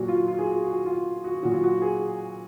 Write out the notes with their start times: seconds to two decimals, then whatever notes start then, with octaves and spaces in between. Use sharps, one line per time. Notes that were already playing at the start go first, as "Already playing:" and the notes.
Already playing: A#2 F#3 F#4
0.08 F4
0.28 F4
0.39 G#4
0.47 F#4
0.66 F#4
0.86 F4
1.24 F#4
1.43 A#2 F#3 F#4
1.53 F4
1.64 F#4
1.82 G#4